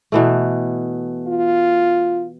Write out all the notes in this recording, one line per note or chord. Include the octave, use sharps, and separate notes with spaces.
B2 E3 A3
F4